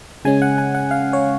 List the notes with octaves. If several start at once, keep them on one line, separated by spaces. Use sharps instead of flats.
C#3 G#3 C#4 G#5
F#5
G#5
F#5
F5
C#5